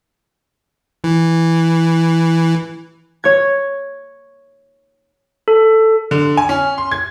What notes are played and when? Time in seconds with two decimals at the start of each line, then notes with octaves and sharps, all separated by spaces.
1.04 E3
3.24 C#5 G#6
5.48 A4
6.11 D3
6.37 G#5
6.49 C#4
6.78 C6
6.92 G#6